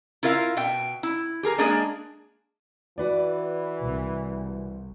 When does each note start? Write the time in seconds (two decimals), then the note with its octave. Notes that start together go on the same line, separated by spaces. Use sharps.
0.23 E4 F4 A#4 E5 F5
0.57 B2 E5 G5
1.03 E4
1.43 G4 G#4 A#4
1.58 G#3 A#3 D4 G#4
2.98 E3 F#4 B4 D5
3.80 C2